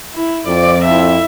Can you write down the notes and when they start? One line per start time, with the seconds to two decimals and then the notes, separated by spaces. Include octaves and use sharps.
0.14 E4
0.47 F2 D5
0.85 E4 E5